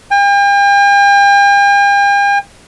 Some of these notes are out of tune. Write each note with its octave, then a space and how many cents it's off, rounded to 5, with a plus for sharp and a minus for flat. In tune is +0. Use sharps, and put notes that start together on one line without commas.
G5 +45